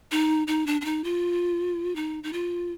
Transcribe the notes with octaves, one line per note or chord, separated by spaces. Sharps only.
D#4
D#4
D4
D4
D#4
F4
D#4
D#4
F4